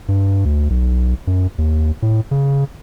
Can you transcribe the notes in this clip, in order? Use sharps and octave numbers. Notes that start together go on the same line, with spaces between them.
G2
D2
B1
F#2
D#2
A2
C#3